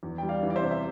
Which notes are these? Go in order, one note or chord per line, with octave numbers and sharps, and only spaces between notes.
E2
G3 G5
D5 F5
E3
D5
C5 E5
C3
E5